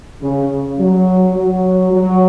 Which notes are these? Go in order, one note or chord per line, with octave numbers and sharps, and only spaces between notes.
C#3
F#3
F#3
F#3